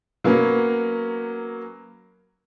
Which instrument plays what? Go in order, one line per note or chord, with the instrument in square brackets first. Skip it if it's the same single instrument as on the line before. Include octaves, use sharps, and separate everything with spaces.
[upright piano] F#3 A#3 B3 C#4